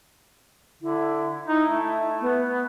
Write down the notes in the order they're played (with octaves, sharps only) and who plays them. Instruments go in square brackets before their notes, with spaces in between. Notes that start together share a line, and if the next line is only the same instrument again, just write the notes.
[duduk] D3 [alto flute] E4
[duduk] D#4 [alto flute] E4
[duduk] A3
[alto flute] B3